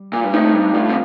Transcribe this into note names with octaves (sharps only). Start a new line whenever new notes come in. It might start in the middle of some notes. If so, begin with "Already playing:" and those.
Already playing: G3
A#2
G2
A2 C4 D#4
G2
A2 D4 F4
C3